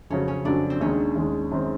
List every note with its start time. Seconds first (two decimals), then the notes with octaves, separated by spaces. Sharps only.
0.10 F2 C#3 F#3 C#4
0.28 C#4
0.45 F2 C#3 F#3 D4
0.70 C4
0.80 D#2 D#3 G#3 C#4
1.15 D#2 D#3 G#3
1.52 F#2 D#3 G#3 C4